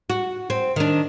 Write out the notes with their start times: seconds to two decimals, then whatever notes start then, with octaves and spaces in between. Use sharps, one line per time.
0.10 F#4
0.50 C4
0.76 D#3 D4